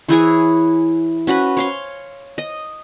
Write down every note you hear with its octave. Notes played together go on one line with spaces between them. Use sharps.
E3 E4 G#4 C#5
C#4 F#4 B4 B5
C#5 F5 C6
D#5